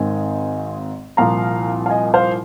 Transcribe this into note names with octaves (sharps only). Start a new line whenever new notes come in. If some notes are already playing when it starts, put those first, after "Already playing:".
Already playing: G#1 G#2 D#3 C4 D#5 G#5
C2 A#2 F3 F5 A#5
F5
D#5 G#5
C5 F5